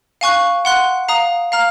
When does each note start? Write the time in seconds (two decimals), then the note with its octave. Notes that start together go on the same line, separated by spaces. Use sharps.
0.21 F5 G#5 C#6 F#6
0.65 F#5 C6 F#6
1.08 F5 A#5 D#6
1.52 F5 A#5 F6